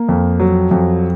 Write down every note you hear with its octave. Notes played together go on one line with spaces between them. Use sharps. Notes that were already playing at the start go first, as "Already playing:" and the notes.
Already playing: A#3
F2
F#3
F2